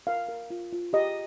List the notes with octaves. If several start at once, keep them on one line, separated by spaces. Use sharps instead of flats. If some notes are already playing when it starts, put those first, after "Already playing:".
A#4 F5
A#4
F4
F4
G4 D#5